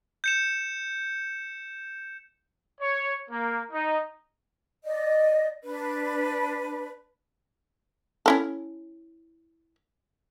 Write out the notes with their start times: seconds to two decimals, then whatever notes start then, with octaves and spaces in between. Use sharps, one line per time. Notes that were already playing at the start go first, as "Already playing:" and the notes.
0.24 G6 C#7 E7
2.80 C#5
3.29 A#3
3.71 D#4
4.85 D5 D#5
5.65 D4 B4
8.26 C#4 E4 A4